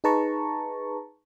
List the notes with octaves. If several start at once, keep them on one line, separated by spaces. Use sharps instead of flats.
D#4 G#4 B4 A5 A#5 C#6